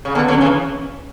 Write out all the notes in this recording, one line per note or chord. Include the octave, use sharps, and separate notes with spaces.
C#3
D3 B3
D3 F#3
C#4
C#3 E3